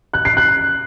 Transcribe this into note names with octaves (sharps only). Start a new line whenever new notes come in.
F#6
C7
F#6